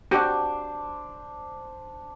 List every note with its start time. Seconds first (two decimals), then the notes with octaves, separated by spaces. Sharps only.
0.11 D4 F#4 G4 C5 D6